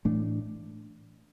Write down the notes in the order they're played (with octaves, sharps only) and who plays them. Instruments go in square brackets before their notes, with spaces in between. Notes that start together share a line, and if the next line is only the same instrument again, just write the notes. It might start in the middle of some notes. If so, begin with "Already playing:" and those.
[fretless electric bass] A2 E3 A3 D4